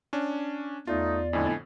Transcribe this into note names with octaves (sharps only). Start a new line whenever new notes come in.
C#4 D4
E2 A3 D#4 F4 D5
F2 A2 D3 D#4 E4 G#5